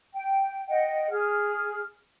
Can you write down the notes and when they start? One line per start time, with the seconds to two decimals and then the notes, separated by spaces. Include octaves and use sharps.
0.14 G5
0.68 D#5 F#5 G5
1.11 G#4 F6